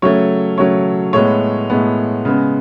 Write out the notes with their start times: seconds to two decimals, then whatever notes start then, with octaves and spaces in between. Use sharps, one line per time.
0.02 C#3 F#3 A3 C#5
0.58 C#3 F#3 A3 C#5
1.13 A2 G#3 B3 C#5
1.70 A2 G#3 B3
2.25 C#3 G#3 B3